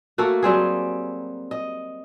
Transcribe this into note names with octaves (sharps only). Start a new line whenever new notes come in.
A3 A#3 F#4 A4
F#3 G3 C4 G#4
D#5